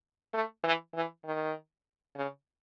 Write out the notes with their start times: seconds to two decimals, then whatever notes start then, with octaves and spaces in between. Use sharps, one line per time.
0.34 A3
0.64 E3
0.95 E3
1.25 D#3
2.16 C#3